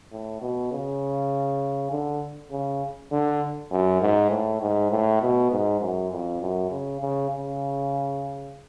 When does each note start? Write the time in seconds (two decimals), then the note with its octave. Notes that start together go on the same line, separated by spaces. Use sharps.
0.12 A2
0.42 B2
0.72 C#3
1.91 D3
2.51 C#3
3.12 D3
3.72 F#2
4.02 G#2
4.31 A2
4.61 G#2
4.91 A2
5.21 B2
5.51 G#2
5.81 F#2
6.11 F2
6.41 F#2
6.71 C#3
7.01 C#3
7.31 C#3